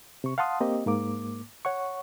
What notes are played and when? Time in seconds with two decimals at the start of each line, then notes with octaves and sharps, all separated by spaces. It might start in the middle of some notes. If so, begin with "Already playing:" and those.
0.24 C3 C#6
0.38 F5 F#5 A5 C6 D#6
0.61 A#3 C4 G4 D#5
0.86 G#2 A#3 D6
1.65 C#5 F#5 C#6